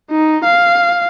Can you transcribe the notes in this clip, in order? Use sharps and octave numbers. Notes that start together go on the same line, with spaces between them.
D#4
F5